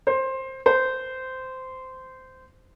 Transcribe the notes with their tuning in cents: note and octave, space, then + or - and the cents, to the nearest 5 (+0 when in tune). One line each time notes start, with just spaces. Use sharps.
C5 +15
C5 -15